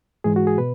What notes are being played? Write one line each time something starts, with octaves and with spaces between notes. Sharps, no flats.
G#2 E3 G#3 G#4
F#4
G#4
B2 B4